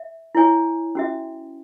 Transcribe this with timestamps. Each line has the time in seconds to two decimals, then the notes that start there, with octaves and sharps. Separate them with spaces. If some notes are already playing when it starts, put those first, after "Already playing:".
Already playing: E5
0.35 E4 C#5 G#5
0.95 C#4 F#4 E5